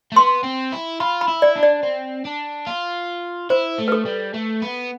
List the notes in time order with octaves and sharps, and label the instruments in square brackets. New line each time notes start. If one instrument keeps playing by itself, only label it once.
[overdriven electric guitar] A3
[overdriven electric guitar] B3 [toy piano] C6
[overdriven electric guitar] C4
E4
[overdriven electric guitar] F4 [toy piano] B5
[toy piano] B5
[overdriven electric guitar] E4
[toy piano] D5
[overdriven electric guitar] D4
[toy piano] D5
[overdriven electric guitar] C4
D4
F4
[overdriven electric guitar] E4 [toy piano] C5
[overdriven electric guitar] A3
[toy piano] B4
A4
[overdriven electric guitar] G3
A3
B3